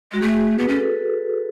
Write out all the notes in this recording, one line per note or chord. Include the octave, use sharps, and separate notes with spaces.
G#3 F#4
A3 G#4
B3 B4
C#4 A4